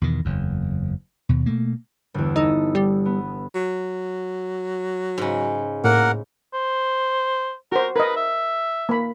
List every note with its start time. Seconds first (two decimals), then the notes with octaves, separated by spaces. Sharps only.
0.01 E2 B2 D#3
0.25 F#1 E2
1.29 D#2 B2
1.46 B2 A3 A#3
2.14 G1 E2
2.36 D#4 A4 D#6
2.75 G3
3.05 B3
3.55 F#3
5.18 G#2 C#3
5.84 A2 A#3 A#4 F#5
6.54 C5
7.72 F#4 A#4 C5
7.96 A#4 B4 D#5
8.16 E5
8.89 A#3 B5